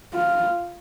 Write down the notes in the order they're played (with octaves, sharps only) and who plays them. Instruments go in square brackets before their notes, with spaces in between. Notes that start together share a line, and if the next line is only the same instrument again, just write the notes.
[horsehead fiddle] F4